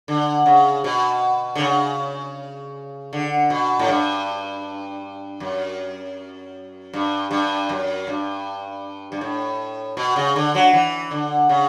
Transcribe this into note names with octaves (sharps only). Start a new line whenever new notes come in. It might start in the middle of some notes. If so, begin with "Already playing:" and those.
D3
C#3
B2
D3
C#3
D3
B2
A2
G2
F#2
G2
G2
F#2
G2
G2
A2
B2
C#3
D3
F#3
E3
D3
C#3